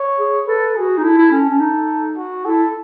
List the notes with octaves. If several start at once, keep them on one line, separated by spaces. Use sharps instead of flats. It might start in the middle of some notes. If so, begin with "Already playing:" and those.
Already playing: C#5
G#4
A4 B4
F#4 G#4
D#4
E4 A4
E4
C#4 A4
C#4
D#4
F#4
E4 A4